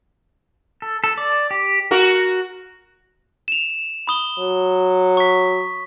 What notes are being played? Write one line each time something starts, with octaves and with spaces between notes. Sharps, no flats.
A4
A4
D5
G4
F#4 A#4
E7 F7
B5 D#6 G7
F#3
C#6 B6